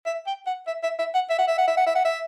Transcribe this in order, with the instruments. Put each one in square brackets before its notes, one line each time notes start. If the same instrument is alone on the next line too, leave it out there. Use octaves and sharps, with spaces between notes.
[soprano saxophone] E5
G5
F#5
E5
E5
E5
F#5
E5
F#5
E5
F#5
E5
F#5
E5
F#5
E5